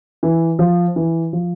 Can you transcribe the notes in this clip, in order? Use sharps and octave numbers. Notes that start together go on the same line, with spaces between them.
E3
F3
E3
F3